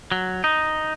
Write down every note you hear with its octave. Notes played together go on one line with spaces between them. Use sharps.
F#3
D#4